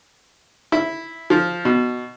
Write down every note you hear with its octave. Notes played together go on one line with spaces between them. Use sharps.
E4
F3
B2